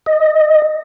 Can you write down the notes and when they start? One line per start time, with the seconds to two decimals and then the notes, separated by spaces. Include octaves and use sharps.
0.06 D#5